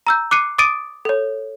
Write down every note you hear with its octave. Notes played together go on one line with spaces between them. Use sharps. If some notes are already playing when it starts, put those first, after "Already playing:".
A#5 E6 G6
D6 F#6 C7 C#7 D#7
D6 D#6 A6 D7 D#7
A4 C#5